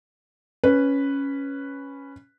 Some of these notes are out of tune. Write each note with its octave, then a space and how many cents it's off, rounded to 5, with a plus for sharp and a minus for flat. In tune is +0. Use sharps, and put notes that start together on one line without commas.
C#4 +0 B4 +0